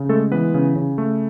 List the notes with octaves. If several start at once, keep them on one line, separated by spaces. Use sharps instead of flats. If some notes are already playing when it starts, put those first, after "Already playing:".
Already playing: C#3
G#3 A3 A4
E3 B3 B4
C#3
C#3
A3